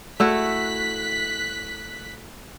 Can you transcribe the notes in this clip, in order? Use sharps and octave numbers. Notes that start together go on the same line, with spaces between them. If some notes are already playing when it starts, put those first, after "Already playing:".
A3 E4 F#4 F#6 B6